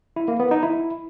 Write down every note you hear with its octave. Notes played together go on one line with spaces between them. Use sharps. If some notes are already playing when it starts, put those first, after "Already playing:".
E4
A#3
B3
D#4
E4